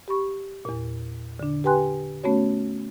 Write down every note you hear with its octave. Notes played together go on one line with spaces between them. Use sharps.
G4 B5 C#6
E2 A#2
D3 D4
G4 B4 G5 G#5 C6 F#6
A3 B3 C#4 F#4 C#5